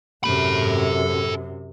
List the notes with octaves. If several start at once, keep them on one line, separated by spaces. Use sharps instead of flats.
F#2 C3 A4 B5